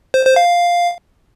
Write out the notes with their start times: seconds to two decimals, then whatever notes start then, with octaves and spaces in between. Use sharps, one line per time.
0.14 C5
0.25 C5
0.36 F5